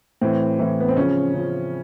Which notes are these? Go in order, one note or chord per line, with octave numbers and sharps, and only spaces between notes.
A2 E3 C4
A2 E3
B3
C4
C#3 F3 C#4
C#3 F3